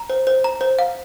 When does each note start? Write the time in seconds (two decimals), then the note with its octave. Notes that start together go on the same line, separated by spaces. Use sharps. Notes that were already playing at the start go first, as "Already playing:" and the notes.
Already playing: A#5
0.10 C5
0.27 C5
0.44 A#5
0.61 C5
0.79 F5